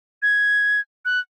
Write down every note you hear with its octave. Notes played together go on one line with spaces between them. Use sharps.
G#6
F#6